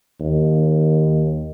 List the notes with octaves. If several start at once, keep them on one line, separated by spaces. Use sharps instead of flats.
D#2